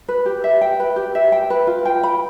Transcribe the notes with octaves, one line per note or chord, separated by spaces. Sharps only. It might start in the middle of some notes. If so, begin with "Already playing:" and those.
B4
G4
E5
G5
B4
G4
E5
G5
B4
F4
G5
B5